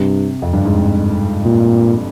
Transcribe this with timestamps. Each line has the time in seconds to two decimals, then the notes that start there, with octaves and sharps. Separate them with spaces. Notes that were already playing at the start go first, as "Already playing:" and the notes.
Already playing: G2 C3
0.42 F2
0.53 G2
0.65 G#2
1.45 A#2